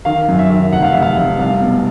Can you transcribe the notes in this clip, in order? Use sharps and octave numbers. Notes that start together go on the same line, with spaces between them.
D#3 F5
F#2
E5
D#3
F1 F#5
F5
F1 E5
F5
F1
C2 F5
B2